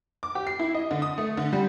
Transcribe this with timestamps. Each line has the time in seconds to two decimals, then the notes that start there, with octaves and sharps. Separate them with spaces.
0.23 D6
0.35 G4
0.47 C7
0.59 E4
0.75 D#5
0.91 D3
1.02 D#6
1.18 A3
1.37 D3
1.53 G3